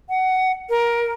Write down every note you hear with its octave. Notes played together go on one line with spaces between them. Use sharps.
F#5
A#4